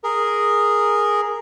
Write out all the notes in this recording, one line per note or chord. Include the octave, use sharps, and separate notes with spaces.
G#4 A#4